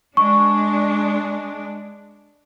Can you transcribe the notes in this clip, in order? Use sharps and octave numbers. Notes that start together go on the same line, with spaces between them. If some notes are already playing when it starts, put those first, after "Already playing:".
G#3 D4 C#6